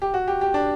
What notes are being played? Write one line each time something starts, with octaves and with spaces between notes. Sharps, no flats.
G4
F#4
G4
G4
D4